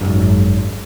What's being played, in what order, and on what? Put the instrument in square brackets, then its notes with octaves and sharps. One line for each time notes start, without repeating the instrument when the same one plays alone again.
[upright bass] G#1 F#2